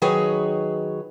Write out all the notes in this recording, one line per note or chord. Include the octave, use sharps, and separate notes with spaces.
D#3 F#3 G#4 B4 C#5